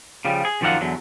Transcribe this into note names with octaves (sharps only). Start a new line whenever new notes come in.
C#3 F3 G3
G#4
F#2 D#3 F3 D5 F5 F#5
E2 D3 F#3